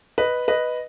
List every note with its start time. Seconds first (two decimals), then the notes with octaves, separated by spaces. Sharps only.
0.18 B4 D#5
0.48 B4 D#5